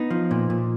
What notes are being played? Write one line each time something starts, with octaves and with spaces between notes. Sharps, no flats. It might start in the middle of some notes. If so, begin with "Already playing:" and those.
Already playing: B3 D#4
F3
A#2
A#2